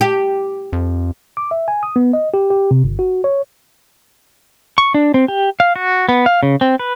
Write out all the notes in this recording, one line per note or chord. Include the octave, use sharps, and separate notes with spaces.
G4
F2
D6
E5
G#5
D#6
B3
D#5
G4
G4
C3
G1
F#4
C#5
C#6
D4
C4
G4
F5
F#4
B3
F5
C#3
C4
B4